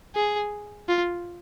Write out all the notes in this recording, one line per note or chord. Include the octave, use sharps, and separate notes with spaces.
G#4
F4